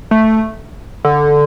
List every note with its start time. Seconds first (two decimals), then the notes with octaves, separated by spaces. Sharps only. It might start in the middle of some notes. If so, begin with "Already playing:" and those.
0.11 A3
1.05 D3